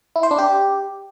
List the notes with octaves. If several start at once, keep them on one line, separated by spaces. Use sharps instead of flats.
E4
C5
D4
G4